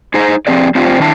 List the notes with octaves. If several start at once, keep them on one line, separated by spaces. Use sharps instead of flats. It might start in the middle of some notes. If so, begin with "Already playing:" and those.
D#4 G#4 C5 A#5
F3 C4 G4 G#4 D5
C4 D4 F4 G4 C5 D5
D#3 D4 E4 A5